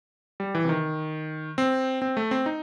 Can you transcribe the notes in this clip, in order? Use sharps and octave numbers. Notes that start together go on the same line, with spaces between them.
G3
E3
C3
D#3
C4
C4
A3
C4
D#4